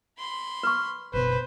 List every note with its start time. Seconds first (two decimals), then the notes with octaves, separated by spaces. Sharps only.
0.19 B5 C6
0.63 B4 C#6
1.13 F#1 B2 B4 C5